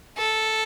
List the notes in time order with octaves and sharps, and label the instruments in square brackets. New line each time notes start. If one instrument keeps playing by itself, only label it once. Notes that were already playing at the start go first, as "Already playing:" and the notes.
[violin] A4